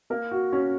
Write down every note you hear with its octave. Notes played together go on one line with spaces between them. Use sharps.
A#3 A#4
F#4
C#4 F#4